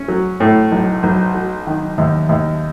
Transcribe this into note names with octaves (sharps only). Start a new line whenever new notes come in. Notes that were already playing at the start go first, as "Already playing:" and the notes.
Already playing: C#4
F#3
A2
B1
B1
F#3
D#3
D#2
D#2